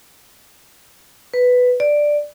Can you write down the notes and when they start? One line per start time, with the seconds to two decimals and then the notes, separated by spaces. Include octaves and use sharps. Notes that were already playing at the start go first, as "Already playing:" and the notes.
1.34 B4
1.80 D5